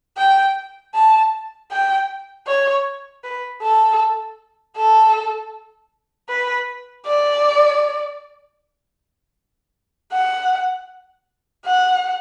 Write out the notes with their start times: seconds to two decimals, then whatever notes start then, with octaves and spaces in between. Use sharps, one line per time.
0.17 G5
0.94 A5
1.71 G5
2.47 C#5
3.24 B4
3.63 A4
4.76 A4
6.29 B4
7.07 D5
10.13 F#5
11.66 F#5